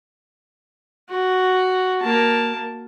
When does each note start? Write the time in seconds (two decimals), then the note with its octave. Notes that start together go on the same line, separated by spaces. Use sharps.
1.09 F#4
2.01 A#3 A5